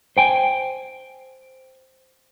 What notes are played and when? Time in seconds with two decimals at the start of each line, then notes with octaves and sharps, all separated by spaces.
0.17 C5 G5 G#5